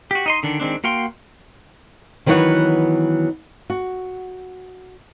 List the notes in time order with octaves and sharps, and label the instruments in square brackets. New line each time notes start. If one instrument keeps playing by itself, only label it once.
[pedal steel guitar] F#4 G4
D#4 D#5 C6
D3 D#3 D4
D#3 G#3 C4 D4
A#3 F#4 F5 G5 C6
[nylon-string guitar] D#3 E3 F#3 B3 C#5 F#5
F#4